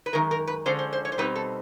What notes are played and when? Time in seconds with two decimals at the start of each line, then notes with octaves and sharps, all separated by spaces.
0.06 B4
0.13 F#2 D#3 G#3 A#4
0.31 A#4
0.47 B4
0.66 D3 F3 G#3 C#4 C5
0.79 C5
0.93 C5
1.05 C#5
1.12 C5
1.18 B2 G3 C4 D#4 B4
1.35 A4